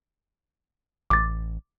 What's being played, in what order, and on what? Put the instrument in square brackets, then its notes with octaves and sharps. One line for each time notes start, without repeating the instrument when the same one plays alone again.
[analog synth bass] A1 [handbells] D6 A6